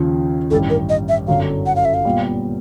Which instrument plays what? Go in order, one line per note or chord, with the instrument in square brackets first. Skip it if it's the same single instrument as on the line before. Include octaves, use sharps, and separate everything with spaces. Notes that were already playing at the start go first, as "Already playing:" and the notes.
Already playing: [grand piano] D#2 C#3 F3
[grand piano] A1 G2 D#3 G3 [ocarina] A4
[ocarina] A#4
D#5
E5
[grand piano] G1 F#2 D3 F#3 [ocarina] F5
[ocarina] F#5
F5
E5
F5
[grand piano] A#2 G3 B3